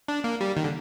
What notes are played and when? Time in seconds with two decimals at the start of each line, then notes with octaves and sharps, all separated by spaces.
0.08 D4
0.24 A#3
0.41 G3
0.57 D#3
0.64 D3